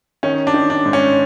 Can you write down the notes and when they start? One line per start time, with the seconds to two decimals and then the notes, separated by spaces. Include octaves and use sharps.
0.23 D#3 C#4
0.47 D4
0.54 D#3
0.70 D4
0.86 G#2
0.93 C#4